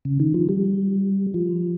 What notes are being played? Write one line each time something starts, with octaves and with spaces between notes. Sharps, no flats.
C#3
D#3
F3
G3
F3